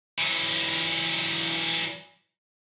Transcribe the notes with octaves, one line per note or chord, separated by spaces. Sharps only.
E3 F#3